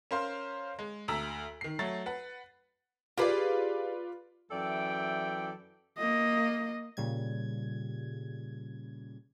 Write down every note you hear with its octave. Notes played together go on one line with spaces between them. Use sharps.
C#4 A#4 C5 F5 C6
G#3
D2 A#5 E6 B6
D#3 C7
F#3 A3 C#5 A6
B4 F#5
F4 G4 G#4 B4 D5 F5
F#2 E3 A4 D5 E5 G5
A#3 D#5
A#2 C#3 G3 G#6